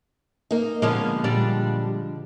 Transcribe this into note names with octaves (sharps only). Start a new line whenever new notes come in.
A#3 D#4
D3 F3 G#3 A#3 B3 C#4
A#2 G3 D4